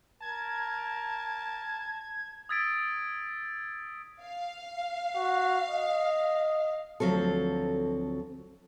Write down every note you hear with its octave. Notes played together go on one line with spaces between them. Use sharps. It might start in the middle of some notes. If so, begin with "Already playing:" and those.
A#4 A5 G#6
D#6 E6 G#6 A6 B6 D7
F5
F#4
D#5
D2 F3 F#3 C4 A4